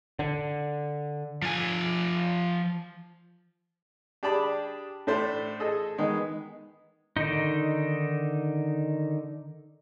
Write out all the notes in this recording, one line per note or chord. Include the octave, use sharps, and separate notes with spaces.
D3
F3 G#5
D4 G4 G#4 D5 A5 B5
A2 A3 D4 C5
G#4 A4 D#5
D#3 G#3 B3
D3 D#3 D#4